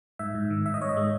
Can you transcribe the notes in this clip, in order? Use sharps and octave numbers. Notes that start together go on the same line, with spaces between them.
G#2 E5
G#2
D#3
G#2 E5
D#5
G#2 C#5
D#5
G#3